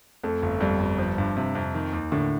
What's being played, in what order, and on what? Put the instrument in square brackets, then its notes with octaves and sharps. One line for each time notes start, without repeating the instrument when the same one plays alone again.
[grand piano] F2 [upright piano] A3
[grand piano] G1
[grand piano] F2 [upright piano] G3
[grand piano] G1
F3
G2
C3
F2
D#3
D#2
[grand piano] A2 [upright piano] D3